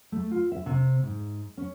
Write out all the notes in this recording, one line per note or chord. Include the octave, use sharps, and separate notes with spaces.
A3
F4
E5
C3
G#2
C#4